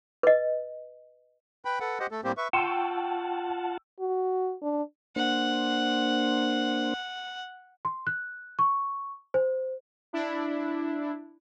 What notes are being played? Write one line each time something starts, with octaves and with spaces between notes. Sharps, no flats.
B4 D#5
B4 G5 B5
A4 B4 F#5
G4 C5 D#5 F#5
A3 A4
A2 G3 A#3 C4 G4 C5
B4 E5 C#6
F4 F#5 G5 A5 C#6 E6
F#4
D4
A#3 D4 C5 F#5
C6
F#6
C#6
C5
D4 E4